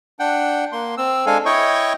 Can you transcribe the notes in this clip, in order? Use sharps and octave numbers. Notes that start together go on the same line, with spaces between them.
D4 F#5 G5
A#3 C6
C4 E6
G#3 D4 A4 F5 G#5
E4 C#5 D#5 G5 C#6